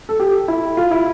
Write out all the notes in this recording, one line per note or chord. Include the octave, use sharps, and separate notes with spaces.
A4
G4
E4
F4
E4